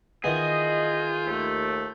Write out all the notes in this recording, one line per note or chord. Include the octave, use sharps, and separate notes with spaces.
D#3 E3 B3 F4 G#4 D#5 G6
D#2 A3